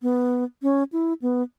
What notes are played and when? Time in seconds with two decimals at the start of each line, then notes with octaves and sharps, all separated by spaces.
0.02 B3
0.62 C#4
0.92 E4
1.22 B3